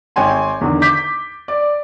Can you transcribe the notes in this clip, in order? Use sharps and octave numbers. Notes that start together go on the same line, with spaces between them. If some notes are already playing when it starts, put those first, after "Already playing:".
G#1 C#5 G5 G#5 C6
E2 D3 D#3
D6 G6 B6
D5